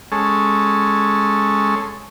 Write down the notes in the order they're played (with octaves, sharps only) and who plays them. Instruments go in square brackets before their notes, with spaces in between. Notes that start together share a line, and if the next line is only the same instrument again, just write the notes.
[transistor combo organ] G#3 C#4 A4